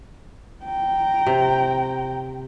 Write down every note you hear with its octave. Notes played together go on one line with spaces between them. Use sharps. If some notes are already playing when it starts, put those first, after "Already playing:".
G5 A#5
C3